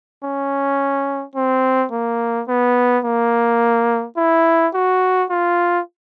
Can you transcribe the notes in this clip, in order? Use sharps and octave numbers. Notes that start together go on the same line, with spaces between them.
C#4
C4
A#3
B3
A#3
E4
F#4
F4